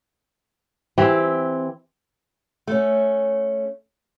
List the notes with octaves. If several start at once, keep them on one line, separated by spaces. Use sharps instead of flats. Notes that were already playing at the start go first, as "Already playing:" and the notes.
E3 C4 G4
A3 C#4